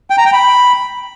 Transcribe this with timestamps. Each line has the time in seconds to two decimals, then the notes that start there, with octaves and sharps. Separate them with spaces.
0.10 G5
0.18 A#5
0.25 G5
0.33 B5